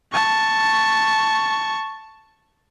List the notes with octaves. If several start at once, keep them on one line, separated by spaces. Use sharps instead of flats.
A5 C#6